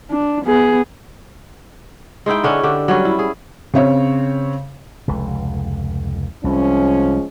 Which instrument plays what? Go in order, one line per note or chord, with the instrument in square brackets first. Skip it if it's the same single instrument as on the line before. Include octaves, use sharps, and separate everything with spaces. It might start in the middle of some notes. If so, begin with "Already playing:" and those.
[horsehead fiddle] D4
B3 G#4
[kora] G#3 D#4 E4 G5
D3 C#4 D4 C#5
D3 D4 G4
F#3 G3 C#4
E4
G#4
[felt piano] C#3 C4 C#5
[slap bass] F1 C#2
[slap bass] C2 [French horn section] F3 G#3 C#4